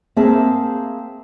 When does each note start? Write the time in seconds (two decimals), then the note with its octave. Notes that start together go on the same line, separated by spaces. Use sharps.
0.16 A#3 C4 G#4 E5 A5